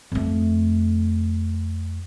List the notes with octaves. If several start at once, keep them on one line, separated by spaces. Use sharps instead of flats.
F2 A3